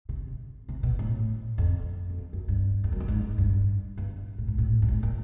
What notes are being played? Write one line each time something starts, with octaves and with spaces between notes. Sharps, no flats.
C3
C3
B2
A2
F2
F#2
F2
F#2
G2
F2
F#2
G2
G#2
G2
G2
A2
G#2
A2
G#2
A2
A#2